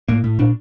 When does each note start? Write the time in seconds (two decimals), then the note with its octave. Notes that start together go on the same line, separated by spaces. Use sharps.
0.08 A2 A#3
0.24 A2
0.39 A#2 D4